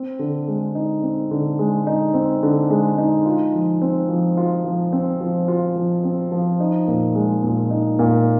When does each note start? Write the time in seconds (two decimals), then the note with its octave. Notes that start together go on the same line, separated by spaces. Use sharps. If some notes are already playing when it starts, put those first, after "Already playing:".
Already playing: C4
0.19 D3
0.48 G#3
0.75 D#4
1.03 C4
1.31 D3
1.59 G#3
1.87 D#4
2.14 C4
2.43 D3
2.70 G#3
2.98 D#4
3.25 F4
3.54 F3
3.81 C4
4.09 F3
4.37 F4
4.64 F3
4.92 C4
5.20 F3
5.48 F4
5.76 F3
6.04 C4
6.32 F3
6.60 D#4
6.88 A#2
7.15 G#3
7.43 A#2
7.71 D#4
7.99 A#2